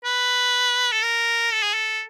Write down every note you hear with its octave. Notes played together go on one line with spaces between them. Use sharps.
B4
A4
A#4
A4
G#4
A4